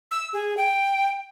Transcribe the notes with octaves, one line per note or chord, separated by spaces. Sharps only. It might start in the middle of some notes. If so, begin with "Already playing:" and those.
E6
G#4
G5